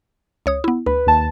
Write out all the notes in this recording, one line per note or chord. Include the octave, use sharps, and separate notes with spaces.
C#2 C#5 D#6
B3 E4
D2 B4
D#2 A5